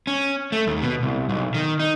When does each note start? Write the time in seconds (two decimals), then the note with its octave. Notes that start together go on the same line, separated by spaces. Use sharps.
0.07 C#4
0.52 A3
0.67 D#2
0.82 B2
1.03 C2
1.29 B1
1.54 D#3
1.80 D#4